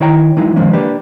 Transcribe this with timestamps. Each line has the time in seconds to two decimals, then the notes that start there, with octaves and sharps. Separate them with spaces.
0.01 D#3 E4 C#5 G5 A#5
0.37 E3 F#3 G#3 D#4 E4
0.56 D3 D#3 F3 G#3 A#3 C#4
0.73 A#3 D4 G4 B4